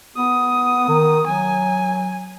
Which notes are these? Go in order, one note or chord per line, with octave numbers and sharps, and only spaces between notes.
B3 D#6
D#3
F#3 G#5